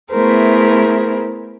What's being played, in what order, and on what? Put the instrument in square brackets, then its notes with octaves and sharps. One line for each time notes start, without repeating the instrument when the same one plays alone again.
[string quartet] A3 B3 E4 G#4 A#4 C5